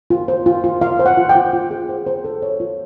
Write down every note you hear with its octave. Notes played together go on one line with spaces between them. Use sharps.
F4
C5
F4
F4
F4 F5
C5
F#5
F4
G5
F4
F4
G#4
C5
C5
A4
C#5
F4